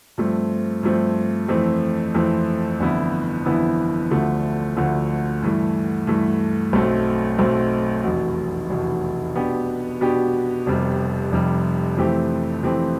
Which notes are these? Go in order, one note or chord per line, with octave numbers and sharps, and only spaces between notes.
G2 F3 A3 C4
G2 F3 A3 C4
F2 E3 A3 C4
F2 E3 A3 C4
G1 F2 E3 B3 E4
G1 F2 E3 B3 E4
D2 D3 F3 A3
D2 D3 F3 A3
G2 E3 A3
G2 E3 A3
B1 B2 A3 C4
B1 B2 A3 C4
F1 E2 B2
F1 E2 B2
B2 B3 D4 G4
B2 B3 D4 G4
F1 F2 C3 G3
F1 F2 C3 G3
F2 E3 A3 C4 G4
F2 E3 A3 C4 G4